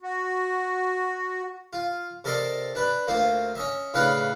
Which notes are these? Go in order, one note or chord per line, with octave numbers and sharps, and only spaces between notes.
F#4
F4
C3 A4 A#4 D5 D#5 C6
D4 B4
D2 A#3 F4 C5
C#4 D#5 E5
A2 C#3 D4 B4 F5 F#5